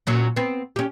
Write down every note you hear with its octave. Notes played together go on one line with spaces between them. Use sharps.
A#2 F#3 C#4
B3 C4
C#4 G4